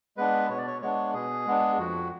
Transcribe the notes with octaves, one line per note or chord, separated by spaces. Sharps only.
G#3 B3 D4 B4
B2 C#5
D5
C#5
G#3 B3 D4 C#5
B2 G#4
G#3 B3 D4
F2 F#4